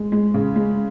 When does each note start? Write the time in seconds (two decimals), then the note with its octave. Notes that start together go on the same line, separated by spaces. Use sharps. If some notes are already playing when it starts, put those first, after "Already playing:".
Already playing: G#3
0.12 G#3
0.34 C#3
0.56 G#3